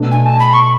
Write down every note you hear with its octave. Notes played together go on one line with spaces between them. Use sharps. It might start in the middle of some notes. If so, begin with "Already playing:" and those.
Already playing: B2 A3 D4
G#5
A5
B5
C#6